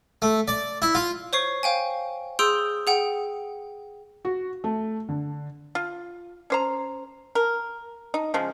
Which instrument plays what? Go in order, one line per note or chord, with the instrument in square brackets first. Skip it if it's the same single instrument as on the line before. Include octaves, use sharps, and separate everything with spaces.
[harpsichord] A3
D5
E4
F4
[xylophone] C5 C#5 C#6 C7
C5 F5 G5 G#5
G#4 C6 D#6 E6 G6 D7
G#4 F#5 G5
[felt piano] F#4
A3
D3
[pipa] F4
C#4 C5 A#5
A#4
D#4
C#3 F3 G#3